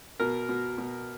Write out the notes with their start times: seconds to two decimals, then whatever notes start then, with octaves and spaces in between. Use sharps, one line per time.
0.20 B2 A#4
0.49 B2
0.78 B2